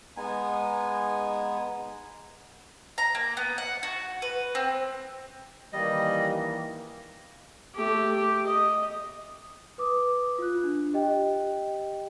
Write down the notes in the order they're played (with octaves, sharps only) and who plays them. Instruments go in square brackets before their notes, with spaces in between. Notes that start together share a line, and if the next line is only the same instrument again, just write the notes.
[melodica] G#3 B3 D#4 G#5
[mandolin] A#5
A#3
B3
F#5
F#4
B4
C4
[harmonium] D#3 E3 A#3 [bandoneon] G3 D#5
[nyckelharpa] A3 G4
G4
D#5
[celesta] B4 D6 D#6
F4 F#6
D4
G4 D#5 G5